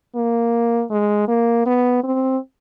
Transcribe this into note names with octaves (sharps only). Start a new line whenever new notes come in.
A#3
G#3
A#3
B3
C4